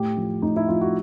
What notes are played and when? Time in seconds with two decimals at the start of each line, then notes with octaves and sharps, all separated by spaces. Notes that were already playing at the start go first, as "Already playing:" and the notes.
Already playing: A2 G4
0.17 F3
0.42 A2 D#4
0.56 E4
0.68 F3 F4
0.81 F#4